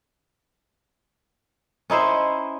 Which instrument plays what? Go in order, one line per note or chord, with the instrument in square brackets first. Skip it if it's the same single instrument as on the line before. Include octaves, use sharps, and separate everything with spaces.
[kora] C#4 D#4 E4 C5